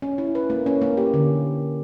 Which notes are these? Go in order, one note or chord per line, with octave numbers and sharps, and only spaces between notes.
C#4
E4
B4
A#3
C#4
A#3
G4
D3